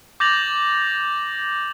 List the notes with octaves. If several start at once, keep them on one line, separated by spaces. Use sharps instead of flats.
D6 G6 A6 A#6 F7 F#7